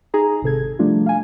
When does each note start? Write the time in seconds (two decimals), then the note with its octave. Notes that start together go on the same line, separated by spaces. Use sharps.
0.14 D#4 G#4 A#5
0.42 G#1 C3 A4 G#6
0.79 F3 G3 A3 D4 F4
1.06 F5 G#5